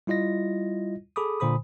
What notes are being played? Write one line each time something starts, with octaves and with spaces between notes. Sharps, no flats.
G3 E4 F4 D#5 A#6
G#4 A4 B5 D6 D#6
A#2 D3 C5 B5 D#6